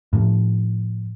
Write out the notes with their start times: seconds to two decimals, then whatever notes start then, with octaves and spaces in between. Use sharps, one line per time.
0.13 A2 F3